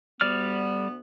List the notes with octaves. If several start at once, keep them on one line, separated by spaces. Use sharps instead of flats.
D2 G3 B3 D5 F6